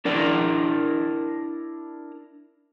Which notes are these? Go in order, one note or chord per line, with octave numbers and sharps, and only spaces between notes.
D4 E4 A#4 D5